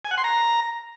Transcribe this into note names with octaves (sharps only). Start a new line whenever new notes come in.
G#5
F#5
C6
A#5